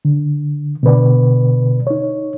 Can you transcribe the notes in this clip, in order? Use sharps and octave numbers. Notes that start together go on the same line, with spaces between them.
D3
B2 D3 B4 D5
D#4 C#5